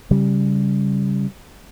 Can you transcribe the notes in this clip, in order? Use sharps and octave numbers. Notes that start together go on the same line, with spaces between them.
C#3 G3